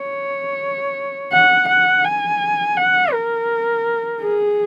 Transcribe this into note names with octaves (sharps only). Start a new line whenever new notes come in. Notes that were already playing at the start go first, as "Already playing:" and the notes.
Already playing: C#5
F#5
F#5
G#5
F#5
A#4
G#4